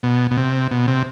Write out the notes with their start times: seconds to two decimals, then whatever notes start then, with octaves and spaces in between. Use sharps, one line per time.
0.03 B2
0.31 B2
0.37 C3
0.71 B2
0.88 C3